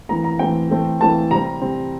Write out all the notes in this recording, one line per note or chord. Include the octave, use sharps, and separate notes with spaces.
E3 A3 C4 A#5
A#5
E3 A3 C4 G5
E3 A3 C4
E3 A3 C4 A5
C3 G3 C4 A#5
C3 G3 C4